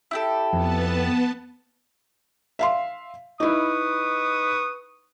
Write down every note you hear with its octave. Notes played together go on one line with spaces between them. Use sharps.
E4 G4 A4
F2 B3 A5
E5 F5 C6
D#4 E4 B4 C#6 D#6